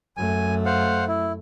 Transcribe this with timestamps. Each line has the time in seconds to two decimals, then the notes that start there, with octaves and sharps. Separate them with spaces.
0.17 F#2 A3 G#5
0.66 C5 F5 F#5
1.08 E4